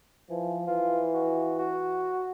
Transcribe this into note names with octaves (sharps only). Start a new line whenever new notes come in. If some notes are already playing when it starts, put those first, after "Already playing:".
E3 F3
E3 F4
F#4
F#4